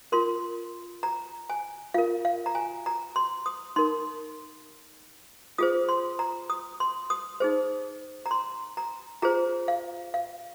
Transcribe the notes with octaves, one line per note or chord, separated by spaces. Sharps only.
F4 A#4 C6
A#5
G#5
F4 A#4 F5
F5
A#5
G#5
A#5
C6
D#6
D#4 A#4 C6
F4 G#4 C5 D#6
C6
A#5
D#6
C6
D#6
D#4 G#4 C5
A#5
C6
A#5
F4 G#4 C5 A#5
F5
F5